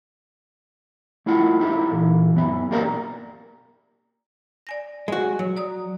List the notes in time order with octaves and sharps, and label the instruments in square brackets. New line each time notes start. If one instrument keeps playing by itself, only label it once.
[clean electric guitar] A3 E4 F4 F#5
D#4 E4 G4 A4
A#2 E3
F#2 B3 E5
B1 A#3 G4 A#4 D5 A#5
[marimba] D5 G#5 A#6
[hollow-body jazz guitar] G#3 F#4
F#3
[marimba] D5 A#5 D#6